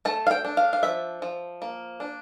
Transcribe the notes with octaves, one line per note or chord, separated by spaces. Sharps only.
A3 A5
F5
G5
D4
F5
F5
F3 E5
F3
A#3
D4